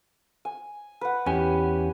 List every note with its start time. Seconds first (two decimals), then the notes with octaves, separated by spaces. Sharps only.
0.45 G#5
1.01 B4 F#5
1.26 E2 C#4 G4 G#5